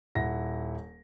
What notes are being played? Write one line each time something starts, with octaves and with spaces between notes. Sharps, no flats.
D#1 E4 F#5 A#6